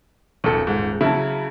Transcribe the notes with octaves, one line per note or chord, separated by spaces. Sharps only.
D#1 B1 A4 C#7
G#2
C#3 F#3 E4 A5